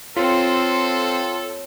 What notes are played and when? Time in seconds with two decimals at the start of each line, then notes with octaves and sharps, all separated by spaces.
0.17 C4 F4 A4 C#5